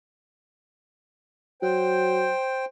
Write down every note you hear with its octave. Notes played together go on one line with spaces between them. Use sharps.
F#3 C5 G5